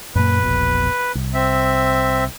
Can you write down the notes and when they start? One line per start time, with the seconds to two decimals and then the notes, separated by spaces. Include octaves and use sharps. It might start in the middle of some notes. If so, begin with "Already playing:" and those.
0.15 F#2 A#2 A#3 B4
0.42 E1 A#1 B2
1.15 C2
1.34 C4 E5